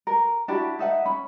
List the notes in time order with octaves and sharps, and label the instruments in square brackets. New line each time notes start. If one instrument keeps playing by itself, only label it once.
[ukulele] A#4
D4 E4 F#4 G4
D#4 E5 F#5
C#4 B5